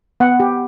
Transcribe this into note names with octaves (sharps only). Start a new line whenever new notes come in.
B3 F#5
G4